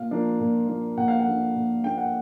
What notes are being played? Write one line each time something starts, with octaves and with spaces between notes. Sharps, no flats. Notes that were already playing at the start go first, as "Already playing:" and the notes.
Already playing: A#2 F5
F3 A#3 D4
A#2
F3 A#3 D4
A#2 F#5
F5
F#5
F3 A#3 D4
A#2
F3 A#3 D4 G5
F#5